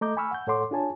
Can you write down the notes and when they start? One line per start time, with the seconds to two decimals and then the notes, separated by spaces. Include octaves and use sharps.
0.01 A3 D#5 A#5 D6 G6
0.17 G#5 B5 C#6 E6 F6
0.31 F#5 G6
0.47 A2 A4 C#5 F#5 C6 D6
0.71 D4 F4 G#4 C#5 G#5 A5